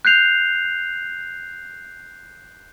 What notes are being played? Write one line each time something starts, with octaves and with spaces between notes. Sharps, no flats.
F#6 G6 C7 F7